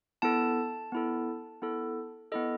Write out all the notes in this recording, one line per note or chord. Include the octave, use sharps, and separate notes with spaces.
B3 E4 A4 A5
B3 E4 A4
B3 E4 A4
B3 E4 A4 D#5